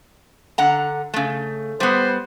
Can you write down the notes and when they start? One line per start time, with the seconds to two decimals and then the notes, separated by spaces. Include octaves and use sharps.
0.58 D3 F#5 A#5
1.14 C#3 A3
1.80 G3 B3 C5